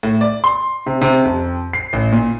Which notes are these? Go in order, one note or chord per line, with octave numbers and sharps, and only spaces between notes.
A2
D5
C6
C3
C3
F2
C7
A1
A#2